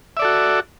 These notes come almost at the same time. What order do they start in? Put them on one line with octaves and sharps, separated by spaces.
E5 D5 A4 F#4